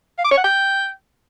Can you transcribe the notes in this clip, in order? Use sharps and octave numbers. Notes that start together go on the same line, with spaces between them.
F5
D6
C#5
F#5
G5